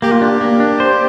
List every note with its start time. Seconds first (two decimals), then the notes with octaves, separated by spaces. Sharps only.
0.02 A#3 G4
0.11 F4
0.21 D4 G4
0.41 A#3
0.60 D4
0.80 C5